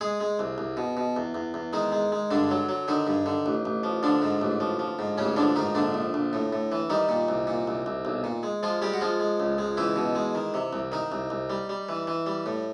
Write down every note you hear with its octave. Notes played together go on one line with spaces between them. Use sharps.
G#3 G#4
G#3
C2
C2
B2
B2
E2
E2
E2
D#3 G#3 D#4
G#3
G#3
G2 D3 D4
F#3
F#3
D3 D#3 D#4
G2
D3
A1
A1
F3
D3 F3 D4
G#2
A1
F3
F3
G#2
A1 C#3 C#4
D3 F3 D4
G#2 D#3 D#4
A#1 D3 D4
A#1
A#1
A2
A2
E3
D#3 G3 D#4
A#2
C2
A#2
C2
C2
B1
A#2
G#3
F3 G#3 F4
G3 G#3 G4
F#4
F3 G#3 F4
G#3
C#2
G#3
C#2 E3 E4
B2
G#3
D#3
C3
C2
D#3 D#4
C2
C2
G3
G3
E3
E3
G3
A2